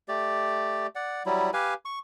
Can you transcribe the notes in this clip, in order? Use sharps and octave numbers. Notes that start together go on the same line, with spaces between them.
A3 G4 D5
D5 F#5
F#3 G3 E4
G4 B4 F5 G#5
C#6